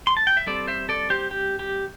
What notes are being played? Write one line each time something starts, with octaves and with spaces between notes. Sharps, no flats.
C6
A5
G5
E5
G3 C4 A4 D5
C5 E5
A4 D5
G4 C5
G4
G4